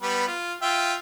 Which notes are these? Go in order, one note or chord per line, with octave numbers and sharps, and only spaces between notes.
G3 B3 B4
F4
F4 E5 G5